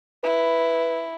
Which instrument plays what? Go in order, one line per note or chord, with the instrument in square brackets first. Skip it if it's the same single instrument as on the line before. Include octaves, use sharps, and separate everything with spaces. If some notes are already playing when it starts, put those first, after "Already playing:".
[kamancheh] E4 [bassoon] B4